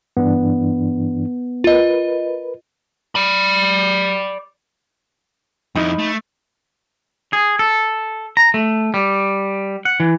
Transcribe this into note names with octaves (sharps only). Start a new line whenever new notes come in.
G2 E3 B3 D4
F4 A#4 B4 D#5
D5 B5
F2 D#4 E4 B5
A3
G#4
A4
A#5
A3
G3
F#5
E3